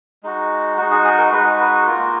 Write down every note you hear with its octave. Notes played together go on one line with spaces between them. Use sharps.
G#3 D#4 F#4
G#3 D#4 F#4
G#4
G#4
A#4
G#3 D#4 F#4 B4
B4
A#3 F4 A#4